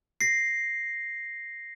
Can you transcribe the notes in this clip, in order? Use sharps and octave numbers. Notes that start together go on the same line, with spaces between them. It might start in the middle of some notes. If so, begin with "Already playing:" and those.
A#6 C7